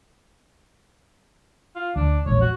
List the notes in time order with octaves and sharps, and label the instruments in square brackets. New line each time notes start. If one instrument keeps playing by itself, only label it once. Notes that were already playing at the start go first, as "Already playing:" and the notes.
[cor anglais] F4
[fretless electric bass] D2 [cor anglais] D4
[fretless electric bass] E1 A#1 [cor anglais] C#5
[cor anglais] F#4